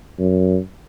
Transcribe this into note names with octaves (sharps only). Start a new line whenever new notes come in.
F#2